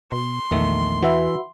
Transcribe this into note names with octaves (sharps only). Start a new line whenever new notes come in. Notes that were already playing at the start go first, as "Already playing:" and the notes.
B2 C6
A#1 E2 D#3 A3
E3 F#4 B4 E5